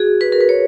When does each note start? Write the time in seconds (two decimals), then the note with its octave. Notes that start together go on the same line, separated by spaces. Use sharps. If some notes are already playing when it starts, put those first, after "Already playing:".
Already playing: F#4 G#4
0.21 B4
0.32 A#4
0.41 B4
0.49 C#5